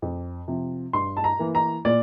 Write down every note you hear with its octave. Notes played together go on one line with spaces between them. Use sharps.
F2
C3 F3
G2 C6
A5
A#5
E3 A#3
A#5
A#2 D5